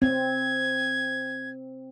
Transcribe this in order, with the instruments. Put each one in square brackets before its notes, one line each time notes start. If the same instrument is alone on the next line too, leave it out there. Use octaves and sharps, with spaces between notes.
[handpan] C4 [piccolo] G#6